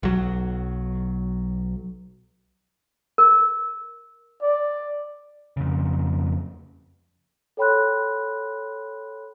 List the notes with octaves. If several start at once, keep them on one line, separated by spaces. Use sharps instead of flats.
B1 F#3
A#4
D5
F2 C#3
A4 C#5 G5 B5 C6 F#6